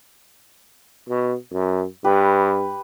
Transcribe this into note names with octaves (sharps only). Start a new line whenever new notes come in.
B2
F#2
G2 G4 B4